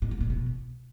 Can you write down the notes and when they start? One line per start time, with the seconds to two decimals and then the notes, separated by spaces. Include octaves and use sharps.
0.02 G#2
0.11 C#3
0.21 A#2
0.30 B2